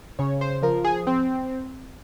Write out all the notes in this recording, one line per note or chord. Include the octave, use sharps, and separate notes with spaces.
C#3 C#5
C5
F3 A#4
G#4
C4